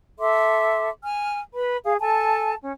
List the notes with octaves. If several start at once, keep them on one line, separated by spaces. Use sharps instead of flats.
A4 E5 C6 D6
G#5 F6
B4 B5
G#4 F5
A4 G#5 A5
C#4